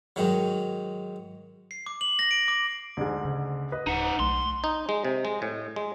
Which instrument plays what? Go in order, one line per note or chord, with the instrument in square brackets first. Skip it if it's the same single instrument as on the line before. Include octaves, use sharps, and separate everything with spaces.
[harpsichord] G#2 D#3 F#3
[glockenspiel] C7
D6
F#7
A#6
D7
D6
[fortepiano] D2 G#2
[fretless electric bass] C#3
[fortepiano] B4 D#5
[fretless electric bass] D1 [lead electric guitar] D#4 F#5
[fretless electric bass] B1 A3 [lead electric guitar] C6
[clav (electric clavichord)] D#4
G#3
C3
G#3
A2
G#3